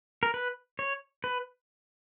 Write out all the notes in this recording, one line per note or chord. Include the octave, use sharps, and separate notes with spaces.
A#4
B4
C#5
B4